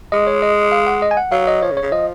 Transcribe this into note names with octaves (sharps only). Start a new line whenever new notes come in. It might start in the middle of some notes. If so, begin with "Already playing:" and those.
G#3 D#5
C#5
D#5
F5
F#5
D#5
G#5
F#5
F#3 F5
D#5
F3 C#5
C#3
C#5
C#3
F3 D#5